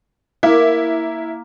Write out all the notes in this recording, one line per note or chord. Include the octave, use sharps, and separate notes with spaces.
A#3 E4